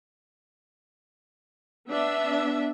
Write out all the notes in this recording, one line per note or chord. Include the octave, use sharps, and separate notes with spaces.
B3 D4 E5